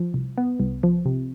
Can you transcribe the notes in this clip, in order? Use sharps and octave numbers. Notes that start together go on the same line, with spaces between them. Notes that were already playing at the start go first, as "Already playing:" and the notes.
Already playing: F3
C2
B3
C2
F3
C3